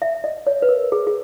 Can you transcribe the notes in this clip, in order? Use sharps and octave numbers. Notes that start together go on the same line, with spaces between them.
E5
D#5
C#5
B4
A#4
G#4
G#4